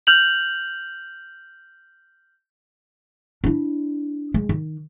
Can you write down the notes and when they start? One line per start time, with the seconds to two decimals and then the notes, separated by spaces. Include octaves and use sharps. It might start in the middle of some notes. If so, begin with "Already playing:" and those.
0.07 F6 G6 F7 F#7
3.44 D4 E4
4.34 G#3
4.49 D#3